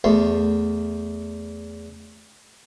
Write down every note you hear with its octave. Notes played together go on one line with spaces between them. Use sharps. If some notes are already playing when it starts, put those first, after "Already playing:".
E2 A3 C6